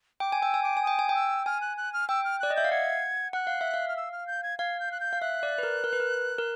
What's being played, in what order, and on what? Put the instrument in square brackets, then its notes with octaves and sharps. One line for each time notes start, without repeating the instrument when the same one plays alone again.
[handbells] G5 [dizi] D6
[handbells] G#5
[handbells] G5 [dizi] E6
[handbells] G#5
[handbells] G5 [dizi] D6
[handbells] G#5
[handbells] G5 [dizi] D#6
[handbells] G#5
[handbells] G5 [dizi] D#6
[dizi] E6
[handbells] G#5 [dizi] F6
[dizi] F#6
F#6
F6
[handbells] G5 [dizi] E6
[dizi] F6
[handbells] D5 [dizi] F#6
[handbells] D#5
[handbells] E5 [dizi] G6
[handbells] F5
[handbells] F#5 [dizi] G#6
[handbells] F#5 [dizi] F#6
[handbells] F5
E5
F5
[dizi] F6
E6
F6
G6
G#6
[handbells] F5 [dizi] G#6
[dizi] G6
F#6
G6
[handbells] F5
[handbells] E5 [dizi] F#6
[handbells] D5
B4
A#4
A#4
B4
A#4
A#4